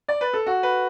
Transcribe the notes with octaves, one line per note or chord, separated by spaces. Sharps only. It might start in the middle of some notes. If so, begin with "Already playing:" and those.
D5
B4
A4
F#4
B4